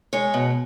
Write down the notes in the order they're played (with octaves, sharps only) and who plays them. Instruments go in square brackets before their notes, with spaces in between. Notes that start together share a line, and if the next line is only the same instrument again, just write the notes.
[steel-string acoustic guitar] G#3 C#5
B2